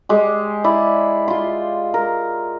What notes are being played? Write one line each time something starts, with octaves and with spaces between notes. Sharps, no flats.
G#3 G4
E4 D5
F4 C6
A#4